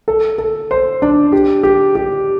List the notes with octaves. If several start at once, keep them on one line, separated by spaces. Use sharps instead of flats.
A4
A4
C5
D4
G4
G4
G4